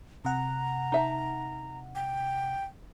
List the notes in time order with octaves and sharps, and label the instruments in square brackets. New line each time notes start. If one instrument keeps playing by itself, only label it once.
[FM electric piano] C3 F#5 [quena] A#5
[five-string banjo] D#4 E5 A5
[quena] G5